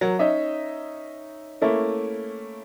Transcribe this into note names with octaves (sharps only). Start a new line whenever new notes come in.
F#3 A#4
C#4 D#4 D#5 E5
A3 A#3 C#4 E4